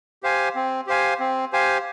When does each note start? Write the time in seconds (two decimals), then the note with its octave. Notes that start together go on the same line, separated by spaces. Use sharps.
0.23 G4 C5 F5 G#5
0.55 C4
0.87 G4 C5 F5 G#5
1.19 C4
1.52 G4 C5 F5 G#5